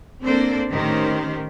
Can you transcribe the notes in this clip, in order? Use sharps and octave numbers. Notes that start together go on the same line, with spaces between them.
A#3 C4 D4 A4 C5 D5
A2 D#3 C#4 G4 C5